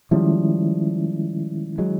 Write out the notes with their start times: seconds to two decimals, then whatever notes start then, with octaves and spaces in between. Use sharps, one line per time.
0.11 D#3 F3 G3 G#3 C#4 E4
1.78 F#3 G#3